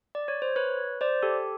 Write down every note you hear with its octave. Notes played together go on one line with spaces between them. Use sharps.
D5
C#5
C5
B4 C#5
C5 D5
G4 A4